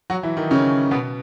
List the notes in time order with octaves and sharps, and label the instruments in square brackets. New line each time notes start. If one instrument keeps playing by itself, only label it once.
[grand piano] F#3 F#4
E3 E4
D#3 D#4
C#3 C#4
B2 B3